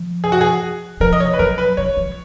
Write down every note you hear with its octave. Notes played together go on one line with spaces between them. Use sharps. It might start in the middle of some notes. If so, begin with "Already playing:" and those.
Already playing: F3
G#4
F#4
G#4
F3 A#4
D#5
C#5
B4
F#3 A#4
B4
F3 C#5
F3